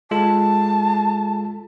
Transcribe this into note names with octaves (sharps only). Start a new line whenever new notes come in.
G#3 F4 A4 A5